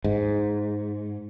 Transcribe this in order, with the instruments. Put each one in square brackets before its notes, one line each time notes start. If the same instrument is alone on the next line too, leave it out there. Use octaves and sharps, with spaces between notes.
[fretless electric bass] G#2